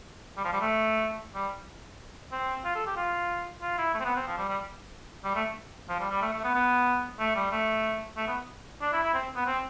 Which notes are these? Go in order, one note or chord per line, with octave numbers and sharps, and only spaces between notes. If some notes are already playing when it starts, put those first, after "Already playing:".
G3
F3
G3
A3
G3
C4
F4
A4
G4
F4
F4
E4
A3
C4
B3
C4
F3
G3
G3
G3
A3
F3
G3
G3
A3
A3
B3
B3
A3
G3
A3
A3
B3
D4
E4
E4
C4
B3
C4